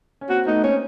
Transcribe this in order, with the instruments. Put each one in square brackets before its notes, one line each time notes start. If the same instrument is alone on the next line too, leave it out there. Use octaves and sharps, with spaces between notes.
[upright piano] C#4
[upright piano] A#3 C4 [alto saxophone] F#4
[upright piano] A3 B3 [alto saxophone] D#4
[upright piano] A#3 C4 [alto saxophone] C#4